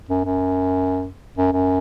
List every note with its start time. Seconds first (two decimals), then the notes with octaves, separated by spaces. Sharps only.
0.09 F#2
0.25 F#2
1.38 F#2
1.53 F#2